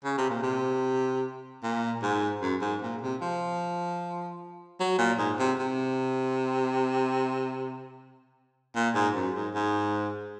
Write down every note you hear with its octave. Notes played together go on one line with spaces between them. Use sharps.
C#3
C3
A#2
C3
A#2
G#2
F#2
G#2
A#2
C3
F3
F#3
A#2
G#2
C3
C3
A#2
G#2
F#2
G#2
G#2